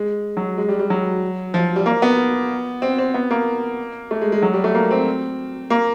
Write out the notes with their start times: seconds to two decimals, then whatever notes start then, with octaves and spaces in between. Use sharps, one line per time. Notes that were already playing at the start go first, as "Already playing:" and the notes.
Already playing: G#3
0.37 F#3
0.58 G#3
0.68 G3
0.79 G3
0.90 F#3
1.54 F3
1.76 G3
1.86 A#3
2.02 B3
2.82 C4
2.99 C4
3.14 B3
3.31 A#3
4.11 A3
4.21 G#3
4.32 G#3
4.42 F#3
4.53 G3
4.64 A3
4.75 A#3
4.91 C4
5.70 A#3